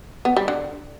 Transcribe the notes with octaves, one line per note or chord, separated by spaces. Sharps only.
B3
G3
D3